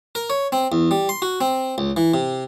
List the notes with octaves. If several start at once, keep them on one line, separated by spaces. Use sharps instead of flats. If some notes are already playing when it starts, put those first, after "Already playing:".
A#4
C#5
C4
E2
G3
C6
F#4
C4
C#2
E3
C3